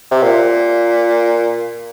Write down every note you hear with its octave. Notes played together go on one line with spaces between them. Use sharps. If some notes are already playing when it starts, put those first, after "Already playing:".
C3
A#2